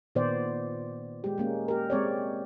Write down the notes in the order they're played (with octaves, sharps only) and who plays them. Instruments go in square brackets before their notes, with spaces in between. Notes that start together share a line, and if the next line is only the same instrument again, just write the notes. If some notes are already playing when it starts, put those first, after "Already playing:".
[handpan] A#2 D#3 B3 C5 D5
G#3 G4
G#3 A#3 C#4
G4 A#4
G#3 C4 C#5 D5